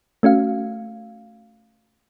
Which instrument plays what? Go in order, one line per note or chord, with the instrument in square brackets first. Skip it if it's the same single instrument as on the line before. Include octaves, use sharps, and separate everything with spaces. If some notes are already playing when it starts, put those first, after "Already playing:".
[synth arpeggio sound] A3 C#4 F#4 F5